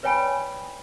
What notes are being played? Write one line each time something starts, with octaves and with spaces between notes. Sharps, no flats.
B4 C#5 D5 G5 G#5 B5